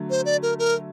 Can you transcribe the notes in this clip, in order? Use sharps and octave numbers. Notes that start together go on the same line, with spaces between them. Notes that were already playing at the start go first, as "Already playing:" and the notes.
Already playing: D3 F#3 A3
C5
D5
A#4
A#4